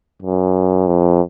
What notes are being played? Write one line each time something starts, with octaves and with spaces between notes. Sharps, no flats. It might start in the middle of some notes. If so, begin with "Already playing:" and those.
F#2
F2